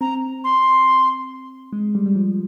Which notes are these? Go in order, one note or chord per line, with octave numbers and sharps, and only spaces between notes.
C4 A#5
C6
G#3
G3
G3
F3